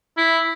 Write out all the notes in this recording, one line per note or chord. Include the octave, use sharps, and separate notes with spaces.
E4